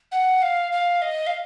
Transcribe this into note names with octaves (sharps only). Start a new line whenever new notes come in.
F#5
F5
F5
D#5
F5